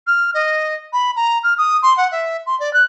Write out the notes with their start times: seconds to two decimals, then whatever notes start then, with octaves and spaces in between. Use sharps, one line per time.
0.07 F6
0.34 D#5
0.93 B5
1.16 A#5
1.44 F6
1.58 D#6
1.82 C6
1.97 F#5
2.12 E5
2.47 C6
2.60 D5
2.74 F#6